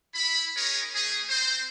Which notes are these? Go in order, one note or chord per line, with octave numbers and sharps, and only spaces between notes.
E4 B5
C#4 D#4 G#4 A#4 C#5
A3 C#4 G#4
C4 C5